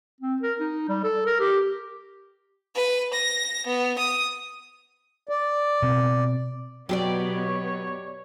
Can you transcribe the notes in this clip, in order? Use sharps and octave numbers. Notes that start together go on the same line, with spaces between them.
C4
A#4
D#4
G3
A4
A#4
G4
B4
A#6
B3
D#6
D5
B2 C4
B2 F#3 B3 G4 G#4 C#5 D5